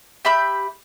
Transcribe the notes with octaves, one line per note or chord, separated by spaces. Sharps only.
G4 E5 B5 G6